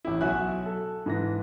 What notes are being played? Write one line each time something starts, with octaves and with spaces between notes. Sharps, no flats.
A1 E4
B1 F#4 E5 G#5 F#6
A4
G#2 E3 A#6